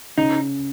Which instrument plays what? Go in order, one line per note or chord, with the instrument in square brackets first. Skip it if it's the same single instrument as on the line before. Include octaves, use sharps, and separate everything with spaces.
[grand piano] C#3 [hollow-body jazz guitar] D#4